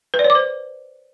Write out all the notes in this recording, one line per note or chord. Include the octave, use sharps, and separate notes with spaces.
B4
D5
C#5
D6
C5